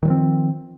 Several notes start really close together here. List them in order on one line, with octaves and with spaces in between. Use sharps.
D#3 F#3 F3 C4